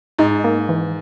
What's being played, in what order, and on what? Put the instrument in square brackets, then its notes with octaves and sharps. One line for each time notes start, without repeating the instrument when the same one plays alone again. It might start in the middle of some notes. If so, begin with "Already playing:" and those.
[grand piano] G#2 [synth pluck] D#4
[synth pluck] A#3
E3